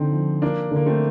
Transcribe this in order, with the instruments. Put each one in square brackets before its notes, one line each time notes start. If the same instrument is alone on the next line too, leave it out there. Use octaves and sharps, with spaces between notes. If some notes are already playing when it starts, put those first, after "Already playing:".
Already playing: [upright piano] D3 [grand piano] C4 D#4
[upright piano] F3
[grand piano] A#3 D4 [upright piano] F4
[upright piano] D3
[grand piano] A#3
A3 C4